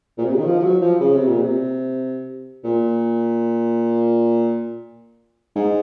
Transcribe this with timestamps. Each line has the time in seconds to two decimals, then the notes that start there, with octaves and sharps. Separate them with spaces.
0.18 A#2
0.24 C3
0.32 C#3
0.38 D#3
0.45 F3
0.59 F3
0.64 F#3
0.82 F3
1.00 C#3
1.15 C3
1.28 A#2
1.42 C3
2.64 A#2
5.56 G#2